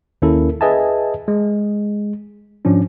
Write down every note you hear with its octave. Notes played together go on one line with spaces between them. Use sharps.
D#2 A#3 C#4 E4 A4 A#4
G#4 B4 D#5 E5 G#5 A5
G#3
G#2 F3 C#4 D4